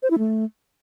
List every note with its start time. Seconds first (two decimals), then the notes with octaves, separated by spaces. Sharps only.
0.03 C5
0.11 E4
0.18 A3